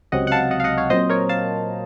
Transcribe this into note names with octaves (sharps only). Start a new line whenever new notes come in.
C#2 C3 F#3 C4 D#5 F#5
F#5
F5 A5
D#5 F#5
F5
D#5 F#5
C#5 F5
A#2 F#3 C4 C5 D#5
A#4 C#5
F5 A5